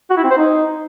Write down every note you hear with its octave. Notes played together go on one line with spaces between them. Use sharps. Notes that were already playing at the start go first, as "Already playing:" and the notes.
F#4
E4
C4
C5
D#4